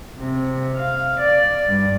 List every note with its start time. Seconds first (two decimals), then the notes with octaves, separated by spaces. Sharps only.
0.19 C3
0.76 F5
1.21 D5
1.67 G2